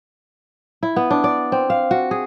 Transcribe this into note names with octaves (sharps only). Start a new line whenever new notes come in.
E4
B3
D4
D5
C4
F5
F#4
G#4